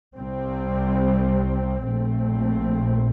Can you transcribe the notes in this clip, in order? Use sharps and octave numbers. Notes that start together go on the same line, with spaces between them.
C2 C3 G3 C4
A#1 A#2 A3 C4